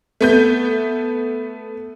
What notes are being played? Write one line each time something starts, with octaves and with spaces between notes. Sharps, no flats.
A3 B3 G6